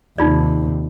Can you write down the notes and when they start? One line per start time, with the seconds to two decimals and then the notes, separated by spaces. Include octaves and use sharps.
0.18 D#2 C3 D#4 F4 D5